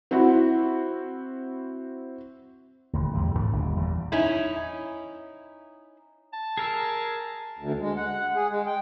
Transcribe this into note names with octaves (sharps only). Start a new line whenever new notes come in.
C4 E4 F#4 F#5 B5
D#1 D2
E2 C3 G3
G#2 D4
G1 D#2 B2
E2 A#2 G3
C#4 D#4 E4
A5
G#4 A#4 E6
D2
G#3
F#5
G#4
G#3
G5